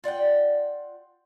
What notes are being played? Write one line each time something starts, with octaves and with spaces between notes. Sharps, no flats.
F4 D5 F#5 G5